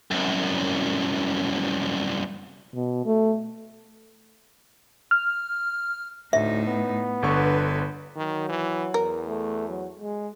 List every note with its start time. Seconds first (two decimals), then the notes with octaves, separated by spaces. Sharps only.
0.11 C2 F#2
2.75 B2
3.06 A3
5.11 F6
6.33 D2 A2 D#4 E5
6.67 B3
7.23 G1 D3 B4 C#6
8.16 D#3 F#3
8.49 E3
8.94 E2 A#4
9.26 A3
9.69 F#3
9.99 G#3